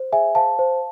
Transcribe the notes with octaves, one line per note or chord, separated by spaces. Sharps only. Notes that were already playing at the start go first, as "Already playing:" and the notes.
Already playing: C5
G#4 E5 G#5
C5 F5 A5
C5